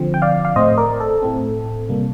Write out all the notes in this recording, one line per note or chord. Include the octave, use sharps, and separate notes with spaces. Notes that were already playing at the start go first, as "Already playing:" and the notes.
Already playing: D3 F3 C4
G5
D5 F5
F5
A2 A3 C4 C5 D#5
A#4 D5
A4
A2 A3 C4
C3 G3 A#3